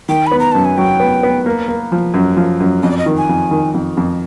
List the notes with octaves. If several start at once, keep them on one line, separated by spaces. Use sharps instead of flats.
D#3 G5
B3 B5
A#5
F#2 A5
G#5
F#3 G5
B3
B3
A#3
A#3
F3
F#2
F3
F#2
F2 D#5
D5
D#5
D#3
G#5
F2
D#3
F2
F2